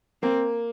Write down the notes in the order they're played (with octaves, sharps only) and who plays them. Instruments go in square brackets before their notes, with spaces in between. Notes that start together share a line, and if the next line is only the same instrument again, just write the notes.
[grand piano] A#3 [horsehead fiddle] C4